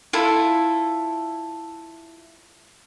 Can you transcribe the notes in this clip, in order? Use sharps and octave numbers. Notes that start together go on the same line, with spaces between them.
E4 F4 A4